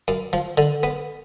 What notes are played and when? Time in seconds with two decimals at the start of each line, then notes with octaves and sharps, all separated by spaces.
0.08 F#2
0.33 F3
0.58 D3
0.83 B3